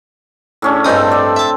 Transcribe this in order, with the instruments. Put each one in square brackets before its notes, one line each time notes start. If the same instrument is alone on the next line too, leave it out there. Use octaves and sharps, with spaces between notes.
[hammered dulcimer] A2 C#4 D4
[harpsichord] G2 D#4 D#6 [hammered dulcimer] C4 A4
[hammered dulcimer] D5
[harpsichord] E5 A5